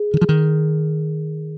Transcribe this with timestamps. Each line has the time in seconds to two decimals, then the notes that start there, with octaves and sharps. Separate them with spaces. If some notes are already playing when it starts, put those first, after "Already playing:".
Already playing: G#4
0.14 D#3
0.21 F3
0.29 D#3